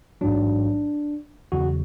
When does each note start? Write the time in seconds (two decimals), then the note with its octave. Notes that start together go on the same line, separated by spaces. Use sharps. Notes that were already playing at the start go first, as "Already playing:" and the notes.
0.21 A1 G#2 F#3 D4
1.52 E2 C#3 F#3 F#4